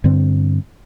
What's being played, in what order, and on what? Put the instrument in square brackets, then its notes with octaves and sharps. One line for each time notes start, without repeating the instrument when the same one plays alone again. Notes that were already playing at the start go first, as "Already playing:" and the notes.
[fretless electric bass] G2 D3 C4